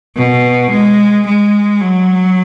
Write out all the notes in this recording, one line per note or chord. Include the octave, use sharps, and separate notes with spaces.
B2
G#3
G#3
F#3